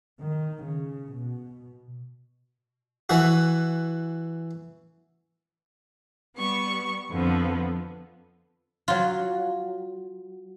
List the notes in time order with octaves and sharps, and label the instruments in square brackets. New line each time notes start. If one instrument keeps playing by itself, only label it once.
[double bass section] D#3
C#3
B2
[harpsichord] E3 F#4
[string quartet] G3 B3 C#6
F2 D3 F3 B3
[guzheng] F#3 F4